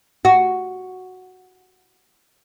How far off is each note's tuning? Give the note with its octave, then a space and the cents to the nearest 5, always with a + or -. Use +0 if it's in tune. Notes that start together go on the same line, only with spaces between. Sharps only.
F#4 +0